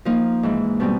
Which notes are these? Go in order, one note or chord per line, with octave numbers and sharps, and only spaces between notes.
F3 A#3 D#4
G#2 E3 G#3
B2 G3 C4 D#4